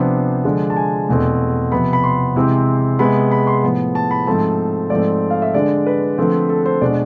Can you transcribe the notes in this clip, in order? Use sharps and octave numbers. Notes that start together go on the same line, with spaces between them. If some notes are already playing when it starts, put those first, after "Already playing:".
Already playing: C3 F3 B3 D4 C5
D3 F3 G#3 D4
A5
G#5
E2 B2 A3 C4
C3 F3 B3 B5
B5
C6
C3 E3 G#3 C4
C3 G#3 B3 B5
B5
C6
A2 F3 B3
A5
B5
G#2 F3 A3 C4 A5
G#2 F3 A3 C4 D5
F5
E5
D3 G#3 D4 D5
B4
D3 F3 A3 C4
A4
C5
B2 G#3 D4 D5